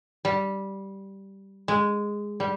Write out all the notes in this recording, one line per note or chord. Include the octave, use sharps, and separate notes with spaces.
G3
G#3
G3